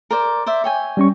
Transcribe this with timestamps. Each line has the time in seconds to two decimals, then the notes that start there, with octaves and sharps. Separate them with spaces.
0.11 A#4 C5 D5
0.46 C5 D5 E5
0.64 C#5 G5 G#5
0.97 G3 C#4 C#6